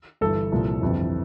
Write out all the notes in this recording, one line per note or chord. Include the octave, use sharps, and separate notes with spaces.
G1 G2 E3 A4
C2 A#2 F3
G1 F2 C3 E3